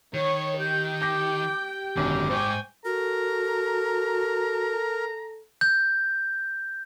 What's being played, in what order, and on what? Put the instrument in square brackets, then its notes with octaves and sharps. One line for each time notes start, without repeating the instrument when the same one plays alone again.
[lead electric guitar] D#3 [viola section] C#5
[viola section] G4 G5 [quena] G6
[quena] D6 [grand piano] G6 A#6
[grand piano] G#1 F#2 B2 [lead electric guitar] D3 [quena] D6
[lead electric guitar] G#2 [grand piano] C5 C#6 [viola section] G5 G#5
[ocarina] F#4 [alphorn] A4 [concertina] A#4 [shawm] A#5
[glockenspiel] G6